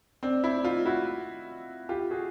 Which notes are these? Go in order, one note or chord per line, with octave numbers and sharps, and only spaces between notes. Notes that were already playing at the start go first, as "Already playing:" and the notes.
C4 D4
D4 E4
D#4 F4
E4 F#4
F4 G4
F#4 G#4